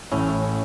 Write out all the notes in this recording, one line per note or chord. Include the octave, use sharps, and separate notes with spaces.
A1 A2 A3 C#4 E4